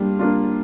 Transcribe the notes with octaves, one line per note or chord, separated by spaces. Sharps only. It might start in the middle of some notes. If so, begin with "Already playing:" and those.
Already playing: G3 A#3 D4 F4
A#3 D4 F4